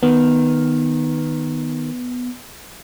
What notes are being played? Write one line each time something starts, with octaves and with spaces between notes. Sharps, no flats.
D#3 B3